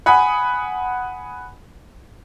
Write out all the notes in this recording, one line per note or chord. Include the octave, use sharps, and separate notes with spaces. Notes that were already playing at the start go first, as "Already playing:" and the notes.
F#5 G#5 B5 D#6